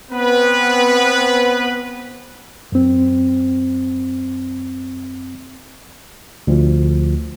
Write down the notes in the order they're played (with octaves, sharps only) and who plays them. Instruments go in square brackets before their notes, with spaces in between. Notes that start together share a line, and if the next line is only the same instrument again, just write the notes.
[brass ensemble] B3 C4 B4
[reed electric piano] F#2 C4
[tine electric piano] D2 F3